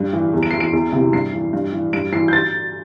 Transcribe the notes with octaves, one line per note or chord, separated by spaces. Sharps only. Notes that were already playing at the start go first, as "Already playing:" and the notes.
Already playing: G2
E3
E2
D7
E3 C7
D7
E2
C3 E3
G2 C7
E3
G2
E3
G2 D7
E3 C7
G6
A6